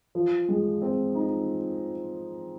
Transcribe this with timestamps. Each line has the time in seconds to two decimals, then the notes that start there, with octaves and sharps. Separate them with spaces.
0.15 F3
0.49 G#3
0.82 C4
1.15 D#4